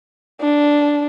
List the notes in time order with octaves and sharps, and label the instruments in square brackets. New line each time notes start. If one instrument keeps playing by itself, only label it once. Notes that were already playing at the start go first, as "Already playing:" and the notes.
[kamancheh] D4